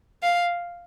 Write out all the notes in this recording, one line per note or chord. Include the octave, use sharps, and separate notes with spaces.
F5